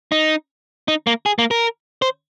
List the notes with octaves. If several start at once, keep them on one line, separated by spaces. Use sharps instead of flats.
D#4
D#4
A#3
G#4
A#3
A#4
C5